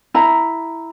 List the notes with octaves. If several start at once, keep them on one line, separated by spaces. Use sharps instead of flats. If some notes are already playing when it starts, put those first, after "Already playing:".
E4 A#5